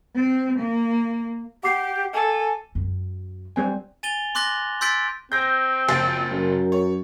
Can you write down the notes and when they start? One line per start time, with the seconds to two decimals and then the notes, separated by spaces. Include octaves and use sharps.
0.15 C4
0.60 A#3
1.63 G4 F#5 D6 C7
2.13 A4 G#5
2.75 F#2
3.56 G3 C4 G#5
4.03 G#5 A6 D#7 F7 G7
4.35 C6 D6 F#6 A6 A#6
4.81 C6 E6 G6 A6 B6 D7
5.32 C4 G6 A#6
5.89 F#1 F3 F4 A6
6.31 F#2 A#4
6.72 C#5